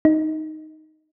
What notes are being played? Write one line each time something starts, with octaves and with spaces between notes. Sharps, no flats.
D#4